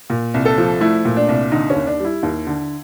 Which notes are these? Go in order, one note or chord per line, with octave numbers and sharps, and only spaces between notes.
A#2
C2
A4
F3
A3 E4
A#2
D4
C2
D3 D#4
C#4
D#2
D4
G3
E4
D#2
D3